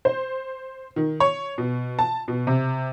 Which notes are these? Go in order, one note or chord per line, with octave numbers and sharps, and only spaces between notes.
C5
D#3
C#5
B2
A5
B2
C3